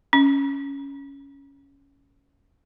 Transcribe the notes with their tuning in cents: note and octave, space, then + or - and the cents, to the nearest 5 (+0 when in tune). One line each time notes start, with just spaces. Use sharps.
C#4 +5